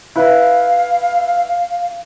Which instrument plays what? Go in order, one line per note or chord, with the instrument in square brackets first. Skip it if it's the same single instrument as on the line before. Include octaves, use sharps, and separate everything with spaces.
[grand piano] E4 B4 [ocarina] F5